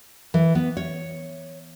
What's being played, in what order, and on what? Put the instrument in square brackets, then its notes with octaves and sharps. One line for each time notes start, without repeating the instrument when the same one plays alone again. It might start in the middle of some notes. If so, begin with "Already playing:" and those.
[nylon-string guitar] E3
B3
C#5